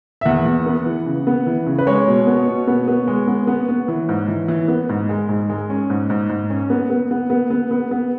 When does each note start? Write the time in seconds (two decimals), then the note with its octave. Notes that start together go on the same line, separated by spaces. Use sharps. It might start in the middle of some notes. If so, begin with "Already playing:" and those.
0.21 E5
0.25 E2 F#5
0.46 E2
0.66 B3
0.86 E3
1.06 C#3
1.27 B3
1.47 E3
1.67 C#3
1.79 B4
1.87 G#3 C#5
2.08 B2
2.27 B3
2.48 B2
2.67 B3
2.88 B3
3.07 G#3
3.27 B3
3.47 B3
3.69 B3
3.88 E3
4.09 G#2
4.28 E3
4.48 E3
4.68 B3
4.89 G#2
5.09 G#3
5.29 G#2
5.49 G#3
5.70 C#4
5.90 G#2
6.10 G#2
6.29 G#2
6.50 C#4
6.70 B3
6.90 B3
7.11 B3
7.30 B3
7.50 B3
7.71 B3
7.91 B3